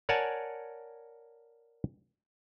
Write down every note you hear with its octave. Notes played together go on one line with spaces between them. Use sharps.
A#4 C#5 D5 F#5 G#5 A5